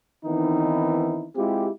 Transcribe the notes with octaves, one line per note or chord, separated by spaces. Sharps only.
D#3 E3 B3 C4 D#4 E4
G#3 C4 E4 F4 G4